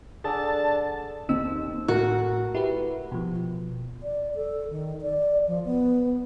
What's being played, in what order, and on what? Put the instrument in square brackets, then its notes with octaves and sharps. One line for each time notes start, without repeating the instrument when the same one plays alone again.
[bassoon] D3 [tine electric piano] G#4 A4 D5 [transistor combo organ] A5
[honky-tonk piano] D#2 C4 [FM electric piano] D#4 E6
[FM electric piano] A2 A3 [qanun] F#4 [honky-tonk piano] A4 A#4
[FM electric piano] E4 G4 B4
B2 F3
[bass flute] D5
A4
D#3
D5
F3
B3